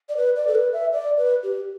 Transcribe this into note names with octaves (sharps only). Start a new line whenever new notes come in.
D5
B4
D5
A4
B4
E5
D5
B4
G4